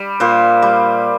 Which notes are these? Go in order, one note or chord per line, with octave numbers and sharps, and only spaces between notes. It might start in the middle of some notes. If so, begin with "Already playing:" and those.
Already playing: G3
A#2 C5
G3